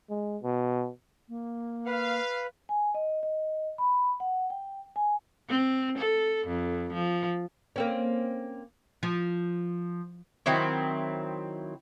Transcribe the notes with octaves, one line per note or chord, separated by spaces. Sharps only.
G#3
B2
A#3
B4 F5
G#5
D#5
D#5
B5
F#5
G5
G#5
C4
A4
F2
F3
A#3 C4 C#4
F3
D#3 F#3 C4 E4